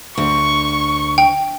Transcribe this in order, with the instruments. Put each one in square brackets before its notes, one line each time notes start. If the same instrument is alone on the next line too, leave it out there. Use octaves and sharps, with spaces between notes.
[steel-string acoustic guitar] D2 [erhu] C#6
[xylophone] G5